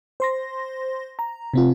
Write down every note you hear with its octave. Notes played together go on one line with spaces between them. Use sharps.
C5 C6 A#6
A#5
C3 C4 F4